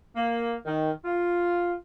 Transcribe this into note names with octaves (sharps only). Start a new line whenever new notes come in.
A#3
D#3
F4